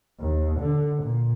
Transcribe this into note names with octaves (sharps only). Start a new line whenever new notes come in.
D#2
D3
A#2